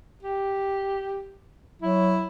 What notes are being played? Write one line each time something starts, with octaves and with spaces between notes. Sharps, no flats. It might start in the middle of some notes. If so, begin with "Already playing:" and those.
G4
F#3 E4